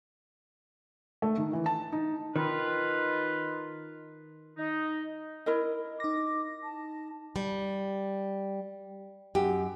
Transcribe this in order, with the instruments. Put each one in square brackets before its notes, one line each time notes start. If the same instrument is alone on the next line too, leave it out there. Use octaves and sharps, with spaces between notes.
[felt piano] A3
D#3
E3
A5
D#4
[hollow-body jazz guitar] D#3 [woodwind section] D#4 F4 B4
[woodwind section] D#4
[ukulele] E4 A#4 D#5
[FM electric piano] D#4 A#6 [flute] D6
[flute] A5
[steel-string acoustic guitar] G3
[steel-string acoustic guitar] F#2 [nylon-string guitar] G4